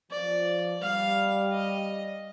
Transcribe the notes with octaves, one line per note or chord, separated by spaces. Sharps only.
F3 D5
G3 F5
D#5